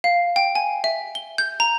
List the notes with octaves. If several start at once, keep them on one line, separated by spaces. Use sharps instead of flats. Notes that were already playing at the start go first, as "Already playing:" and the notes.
F5
G5
G#5
E5
G7
G6
A#5